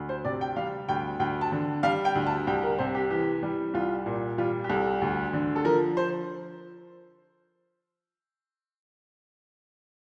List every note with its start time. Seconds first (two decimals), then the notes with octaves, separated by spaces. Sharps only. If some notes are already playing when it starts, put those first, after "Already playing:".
Already playing: D2
0.09 C5
0.25 C3 D5
0.41 G5
0.56 G3 F5
0.88 D2 G5
1.19 D2 G5
1.41 A5
1.52 D3
1.83 G3 F5
2.05 G5
2.15 D2
2.27 A5
2.47 C2 G5
2.63 A#4
2.78 C3 C5
2.95 G4
3.10 E3 G4
3.43 G3
3.74 C2 F4
4.06 A#2
4.38 G3 F4
4.64 G4
4.70 C2 A4
5.01 D2
5.33 D3
5.56 A4
5.64 F3 A#4
5.97 C5